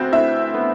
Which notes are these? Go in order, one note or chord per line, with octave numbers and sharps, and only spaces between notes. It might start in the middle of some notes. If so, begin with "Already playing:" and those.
Already playing: D2 B3 C4 F#4 C5
D2 E4 E5
B3